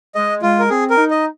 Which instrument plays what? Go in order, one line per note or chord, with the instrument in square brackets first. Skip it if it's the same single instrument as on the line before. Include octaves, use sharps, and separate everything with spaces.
[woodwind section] G#3 [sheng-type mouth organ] D#5
[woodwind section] G#3 [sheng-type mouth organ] F4
[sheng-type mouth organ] A#4
[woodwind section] C4 [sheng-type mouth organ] G#4
[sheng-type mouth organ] A#4
[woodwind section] D#4
[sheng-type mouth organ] D#5